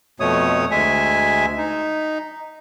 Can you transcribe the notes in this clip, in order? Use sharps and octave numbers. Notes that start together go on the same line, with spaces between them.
F2 B2 A3 C#5 D#6
D2 G#3 E5 G#5
D#4